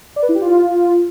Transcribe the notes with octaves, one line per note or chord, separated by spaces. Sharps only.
D5
B4
E4
G4
F4